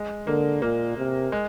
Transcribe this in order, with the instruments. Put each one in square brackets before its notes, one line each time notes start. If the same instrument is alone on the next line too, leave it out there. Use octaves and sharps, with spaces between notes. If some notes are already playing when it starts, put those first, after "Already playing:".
Already playing: [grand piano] G#3
[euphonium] D3 [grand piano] A#3
[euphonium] A#2 [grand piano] A#3
[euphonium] C3
[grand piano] G#3